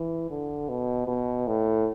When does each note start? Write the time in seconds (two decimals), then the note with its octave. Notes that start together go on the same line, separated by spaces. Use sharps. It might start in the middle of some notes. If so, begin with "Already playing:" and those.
Already playing: E3
0.30 D3
0.69 B2
1.07 B2
1.47 A2